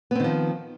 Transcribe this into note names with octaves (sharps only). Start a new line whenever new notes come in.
D#3 F3 B3 C4